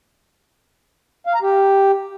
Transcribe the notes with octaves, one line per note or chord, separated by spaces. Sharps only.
F5
A#5
G4